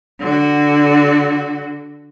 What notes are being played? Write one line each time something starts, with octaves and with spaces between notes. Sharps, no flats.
D3 F#4